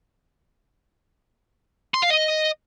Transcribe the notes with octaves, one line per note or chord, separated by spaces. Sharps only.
C6
F5
D#5